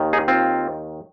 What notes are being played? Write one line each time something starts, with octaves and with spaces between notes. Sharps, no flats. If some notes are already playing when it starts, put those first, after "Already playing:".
Already playing: D#2 D#3
D#4 G#4
C4 F4